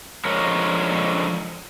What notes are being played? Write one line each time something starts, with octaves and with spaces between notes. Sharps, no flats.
D3 F3 G#3 A#4 C#5